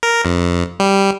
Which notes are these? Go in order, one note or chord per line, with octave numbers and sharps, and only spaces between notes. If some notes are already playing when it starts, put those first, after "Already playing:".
A#4
F2
G3